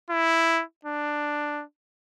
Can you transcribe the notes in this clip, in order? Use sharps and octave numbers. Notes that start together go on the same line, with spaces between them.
E4
D4